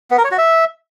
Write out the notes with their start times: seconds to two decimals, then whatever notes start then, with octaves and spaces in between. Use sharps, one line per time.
0.11 B3
0.18 A#4
0.24 C#5
0.31 F#4
0.38 E5